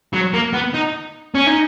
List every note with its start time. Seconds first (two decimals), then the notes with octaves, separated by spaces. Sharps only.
0.13 F#3
0.34 A#3
0.53 B3
0.74 D#4
1.35 C#4
1.47 D#4